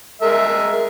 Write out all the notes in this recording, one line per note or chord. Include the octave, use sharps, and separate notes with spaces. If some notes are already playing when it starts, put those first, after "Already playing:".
G#3 A#4 E5